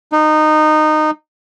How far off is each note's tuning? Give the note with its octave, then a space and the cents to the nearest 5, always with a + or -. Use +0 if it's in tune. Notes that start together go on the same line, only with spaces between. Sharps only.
D#4 -15